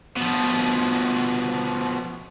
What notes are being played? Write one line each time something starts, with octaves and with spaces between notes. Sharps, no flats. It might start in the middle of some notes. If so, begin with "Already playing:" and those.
B2 F3